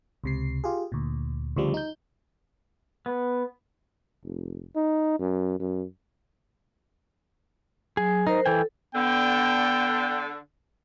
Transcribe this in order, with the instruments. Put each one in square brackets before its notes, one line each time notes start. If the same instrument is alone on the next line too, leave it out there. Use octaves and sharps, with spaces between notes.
[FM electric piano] C#2 C3 C7
F4 G4 G#4
D2 A#2
D2 C#3 F3 G3
D#4 G6
[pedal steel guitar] B3
[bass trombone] F1
D#4
F#2
F#2
[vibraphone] F#3 [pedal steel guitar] G#4
[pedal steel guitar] D#4 [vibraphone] A#4 C5
[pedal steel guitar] E3 G5 G#5 [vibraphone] A4
[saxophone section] D3 [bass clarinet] B3 [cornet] G5